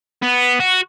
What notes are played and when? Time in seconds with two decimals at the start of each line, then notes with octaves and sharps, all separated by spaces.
0.22 B3
0.60 F#4